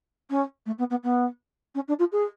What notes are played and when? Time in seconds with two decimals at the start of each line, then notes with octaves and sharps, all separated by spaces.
0.30 C#4
0.66 A3
0.78 B3
0.90 B3
1.03 B3
1.75 C#4
1.88 D4
1.99 F4
2.12 G#4